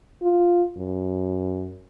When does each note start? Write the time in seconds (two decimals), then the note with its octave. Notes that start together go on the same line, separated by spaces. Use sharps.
0.22 F4
0.77 F#2